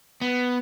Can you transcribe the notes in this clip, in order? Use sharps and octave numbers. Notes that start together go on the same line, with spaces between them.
B3